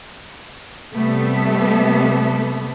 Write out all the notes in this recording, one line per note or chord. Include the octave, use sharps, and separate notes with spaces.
C3 G3 A3 B3 A4 E5